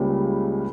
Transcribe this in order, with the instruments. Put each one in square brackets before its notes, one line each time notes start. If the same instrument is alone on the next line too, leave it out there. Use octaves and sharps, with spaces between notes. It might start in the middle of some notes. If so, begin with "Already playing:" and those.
Already playing: [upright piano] C#2 C#3 G3 A#3